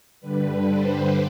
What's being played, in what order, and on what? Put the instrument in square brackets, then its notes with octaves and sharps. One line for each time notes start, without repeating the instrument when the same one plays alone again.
[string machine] G2 D3 G3 B4
C5